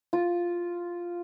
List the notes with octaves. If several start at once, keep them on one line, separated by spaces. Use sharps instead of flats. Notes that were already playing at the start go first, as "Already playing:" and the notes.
F4